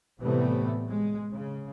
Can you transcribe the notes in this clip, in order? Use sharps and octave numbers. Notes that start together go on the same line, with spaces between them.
A2 C3 E3 G3 A3 B3
G#3
C#3